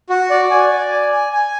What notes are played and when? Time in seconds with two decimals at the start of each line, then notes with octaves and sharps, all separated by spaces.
0.10 F#4
0.30 D5
0.51 G#5
0.71 D5
0.91 G#5
1.12 G#5
1.33 G#5